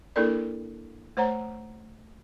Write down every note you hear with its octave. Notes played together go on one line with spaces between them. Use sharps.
A#3 D4 E4 A4 A#4 D5
A3 C5 C#5 F#5 A#5